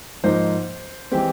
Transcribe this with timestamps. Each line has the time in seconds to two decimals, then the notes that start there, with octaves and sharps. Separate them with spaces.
0.23 G#2 F3 A#3 D#4 C5
1.12 E3 G#3 C4 G4